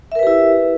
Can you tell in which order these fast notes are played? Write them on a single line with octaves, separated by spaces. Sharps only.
E5 A#4 B4 G4 E4